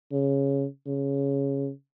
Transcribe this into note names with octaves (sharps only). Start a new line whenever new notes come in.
C#3
C#3